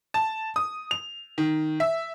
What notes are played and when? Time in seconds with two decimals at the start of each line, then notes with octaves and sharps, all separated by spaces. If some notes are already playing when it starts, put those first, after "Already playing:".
0.14 A5
0.56 D#6
0.91 F7
1.38 D#3
1.80 E5